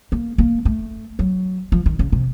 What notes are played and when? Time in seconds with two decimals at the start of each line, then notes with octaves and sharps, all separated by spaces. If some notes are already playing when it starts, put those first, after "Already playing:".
0.12 A#3
0.38 A#3
0.65 A3
1.19 F#3
1.72 F3
1.86 D#3
1.99 C#3
2.12 C3